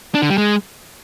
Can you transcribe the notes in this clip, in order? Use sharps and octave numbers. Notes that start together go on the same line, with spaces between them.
D4
D3
G3
G#3